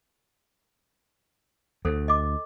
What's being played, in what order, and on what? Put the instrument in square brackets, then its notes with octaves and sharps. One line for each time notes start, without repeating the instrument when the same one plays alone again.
[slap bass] D2 [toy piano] A4 C5
[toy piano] D#5 D6